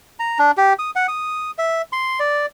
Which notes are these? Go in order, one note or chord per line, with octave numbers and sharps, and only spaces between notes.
A#5
D4
G4
D#6
F#5
D#6
E5
C6
D5